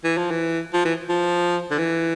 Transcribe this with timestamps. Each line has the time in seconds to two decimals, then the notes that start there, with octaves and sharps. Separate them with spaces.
0.04 E3
0.18 F3
0.31 E3
0.74 F3
0.85 E3
1.09 F3
1.71 D3
1.78 E3